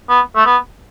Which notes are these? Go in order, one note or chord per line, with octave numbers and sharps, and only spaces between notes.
B3
A3
B3